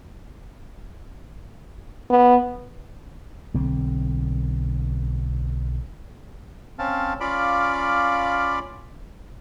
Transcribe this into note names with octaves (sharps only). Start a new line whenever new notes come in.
B3
B1 D3 C4
C4 C#4 F5 A5
C#4 F4 D5 F5 B5 D6